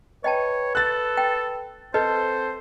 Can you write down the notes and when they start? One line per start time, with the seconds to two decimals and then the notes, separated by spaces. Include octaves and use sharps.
0.24 B4 C#5 D#5 G5 A5
0.75 A4 F#6 A6
1.17 G5
1.94 C4 A4 B4 C5 D#5